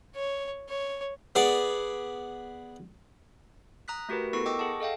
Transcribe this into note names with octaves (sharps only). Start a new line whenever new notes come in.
C#5
C#5
B3 G#4 D5
A#5 D#6 F#6 B6
A3 F#4 G4 A#4 B4
B3 E4 A4 A#4 C#6 C7
D#5 G5 C#6 D6 E6
G#4 F#5 A5
A4 D#5 F5 G5